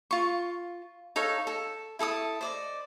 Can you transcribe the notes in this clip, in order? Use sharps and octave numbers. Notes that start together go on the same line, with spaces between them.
F4 C#6
D#4 A4 C#5 F5
A4
E4 A4 A5 D#6
C5 D5 D#5